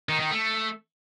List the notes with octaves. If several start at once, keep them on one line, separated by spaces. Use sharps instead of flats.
D#3
D#3
A3